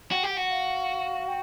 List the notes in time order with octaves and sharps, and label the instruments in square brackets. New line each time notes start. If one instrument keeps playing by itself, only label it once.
[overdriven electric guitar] F#4 [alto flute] G5
[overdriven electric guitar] G4
[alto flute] F#5
[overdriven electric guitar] F#4
[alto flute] F5
G5